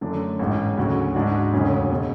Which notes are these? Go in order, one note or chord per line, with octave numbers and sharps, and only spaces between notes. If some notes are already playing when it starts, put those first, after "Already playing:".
F#2 D3 A3 D4
A1 G#2 G#3
D2 C#3 F#3 C#4 F#4
G#2 G#3 D4 F#4
E1 D2 C#3 G#3 C#4
B2